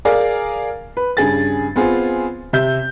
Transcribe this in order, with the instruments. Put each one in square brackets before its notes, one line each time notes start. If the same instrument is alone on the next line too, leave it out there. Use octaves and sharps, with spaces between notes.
[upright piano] G#4 A#4 D5 F5 G#5
B4
G2 C#3 G#4 A6
B3 C4 F4 G#4
C3 E5 G6